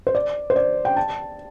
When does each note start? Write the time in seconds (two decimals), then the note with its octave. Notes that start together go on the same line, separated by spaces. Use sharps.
0.07 C5
0.15 D5
0.50 C5
0.56 D5
0.85 G5
0.96 A5